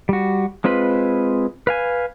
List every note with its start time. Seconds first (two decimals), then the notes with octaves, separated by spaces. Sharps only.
0.09 G3 F#4
0.64 G#3 C4 F4 B4 B5
1.67 B4 F5 G#5